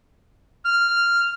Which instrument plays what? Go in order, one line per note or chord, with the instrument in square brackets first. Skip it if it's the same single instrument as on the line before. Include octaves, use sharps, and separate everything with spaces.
[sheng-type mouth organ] F6